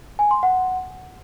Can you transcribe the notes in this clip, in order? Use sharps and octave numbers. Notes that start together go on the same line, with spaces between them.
G#5
C6
F#5